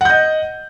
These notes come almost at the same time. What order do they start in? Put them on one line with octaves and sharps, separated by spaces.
F#5 G6 D#5